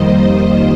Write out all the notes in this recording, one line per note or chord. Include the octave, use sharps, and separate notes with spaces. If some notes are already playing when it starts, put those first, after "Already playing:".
Already playing: F2 D#3 G3 A#3 C5 D#5